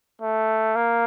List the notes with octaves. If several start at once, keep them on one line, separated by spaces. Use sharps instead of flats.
A3
A#3